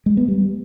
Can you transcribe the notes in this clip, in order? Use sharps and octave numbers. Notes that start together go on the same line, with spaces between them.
G#3
B3
G3